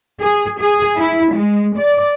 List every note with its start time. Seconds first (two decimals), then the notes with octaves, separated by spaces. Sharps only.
0.21 G#4
0.59 G#4
0.98 E4
1.34 G#3
1.77 D5